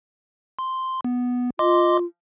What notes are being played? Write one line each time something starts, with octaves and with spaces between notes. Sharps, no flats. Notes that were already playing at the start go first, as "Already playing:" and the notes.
C6
B3
F4 D#5 C6 D6